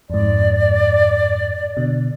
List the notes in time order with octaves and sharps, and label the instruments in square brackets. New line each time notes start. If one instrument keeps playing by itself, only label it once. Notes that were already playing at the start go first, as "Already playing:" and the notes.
[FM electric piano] F2 G#2 [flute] D5
[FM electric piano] B2 D3